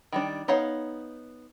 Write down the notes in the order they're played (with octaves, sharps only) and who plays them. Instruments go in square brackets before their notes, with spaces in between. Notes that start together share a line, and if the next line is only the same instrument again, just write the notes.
[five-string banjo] D#3 G3 D4
B3 D#4 C#5 F5 F#5